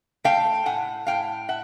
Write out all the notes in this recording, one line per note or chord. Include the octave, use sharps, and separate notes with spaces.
A3 F5 G5
A2 F#5 G#5
A2 F5 G5
E5 F#5